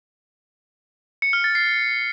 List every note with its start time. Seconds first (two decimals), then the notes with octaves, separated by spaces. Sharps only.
1.22 C#7
1.33 F6
1.44 A6
1.55 C7